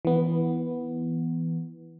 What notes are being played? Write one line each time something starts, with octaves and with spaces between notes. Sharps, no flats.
E3 B3